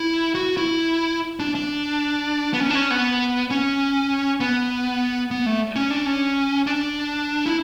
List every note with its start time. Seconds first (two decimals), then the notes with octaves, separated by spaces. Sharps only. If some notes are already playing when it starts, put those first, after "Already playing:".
Already playing: E4
0.35 F#4
0.57 E4
1.40 D4
1.55 D4
2.53 B3
2.60 C#4
2.70 D4
2.75 C#4
2.91 B3
3.51 C#4
4.40 B3
5.31 B3
5.46 A3
5.76 C#4
5.90 D4
6.06 C#4
6.67 D4
7.46 E4